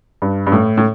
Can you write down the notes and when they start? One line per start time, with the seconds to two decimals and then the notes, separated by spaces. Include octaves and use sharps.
0.22 G2
0.47 G2
0.52 A2
0.77 A2